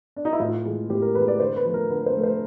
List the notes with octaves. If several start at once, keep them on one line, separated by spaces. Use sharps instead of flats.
D4
D#4
E4
A2 F4
E3 G#3
A2 G4
A#4
E3 G#3 B4
D5
D3 C5
B4
F3 A3
A#4
D3 B4
C5
F3 A3
C5